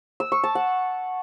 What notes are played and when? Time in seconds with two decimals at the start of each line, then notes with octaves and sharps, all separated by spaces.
0.20 E6
0.32 C#6
0.44 A5
0.55 F#5